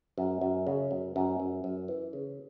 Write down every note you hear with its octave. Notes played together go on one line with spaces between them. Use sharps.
F#2
F#2
C#3
F#2
F#2
F#2
F#2
E3
C#3